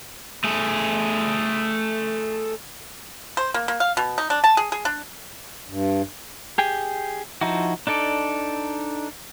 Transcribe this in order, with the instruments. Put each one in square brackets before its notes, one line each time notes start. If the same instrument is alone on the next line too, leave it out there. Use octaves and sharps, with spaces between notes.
[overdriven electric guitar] A3 G#4
[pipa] C5
A#3
A#3
F5
B2
D#4
D4
A5
G#4
G#4
D4
[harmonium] G2
[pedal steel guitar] G4 G#4 G5
F3 D#4 E4 F#4
D4 D#4 A4 D5